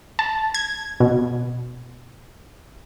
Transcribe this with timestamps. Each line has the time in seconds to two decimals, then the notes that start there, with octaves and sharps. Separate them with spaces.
0.19 A5
0.54 G#6
1.00 B2